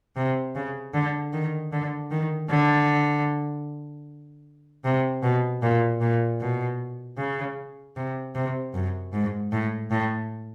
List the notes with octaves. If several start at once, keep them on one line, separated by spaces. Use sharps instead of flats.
C3
C#3
D3
D#3
D3
D#3
D3
C3
B2
A#2
A#2
B2
C#3
C3
C3
F#2
G#2
A2
A2